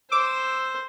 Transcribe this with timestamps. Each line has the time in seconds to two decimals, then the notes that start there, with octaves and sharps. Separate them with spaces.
0.12 C5 D6 E6